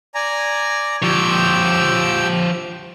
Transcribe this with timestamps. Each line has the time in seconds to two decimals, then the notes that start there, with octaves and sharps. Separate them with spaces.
0.15 D5 G#5 A#5
1.03 F3 G4 C#5 G5 E6